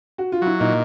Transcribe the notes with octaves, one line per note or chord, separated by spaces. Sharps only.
F#4
F4
F#3 E4
A#2 D#4